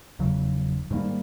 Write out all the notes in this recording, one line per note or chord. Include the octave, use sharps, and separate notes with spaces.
F1 E2 C#3 F#3
G#2 D#3 G3 A#3